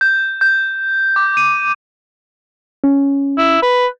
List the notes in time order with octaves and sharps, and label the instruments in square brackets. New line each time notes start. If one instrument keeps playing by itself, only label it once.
[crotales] G6
G6
D6
D#7
[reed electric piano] C#4
[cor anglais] E4
B4